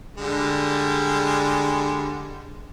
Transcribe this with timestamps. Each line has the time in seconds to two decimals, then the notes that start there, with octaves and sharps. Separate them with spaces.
0.18 D3 G3 G#3